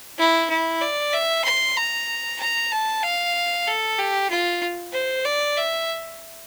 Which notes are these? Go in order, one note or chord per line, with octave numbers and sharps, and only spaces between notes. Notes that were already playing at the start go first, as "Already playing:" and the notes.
E4
E4
D5
E5
C6
A#5
A#5
A5
F5
A4
G4
F4
C5
D5
E5